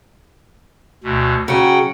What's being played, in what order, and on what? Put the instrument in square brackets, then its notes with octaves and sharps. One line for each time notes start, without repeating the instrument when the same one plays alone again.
[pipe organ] D2 B2
[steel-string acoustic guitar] C#3 G#4 [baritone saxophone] F#3 [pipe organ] F#5 G5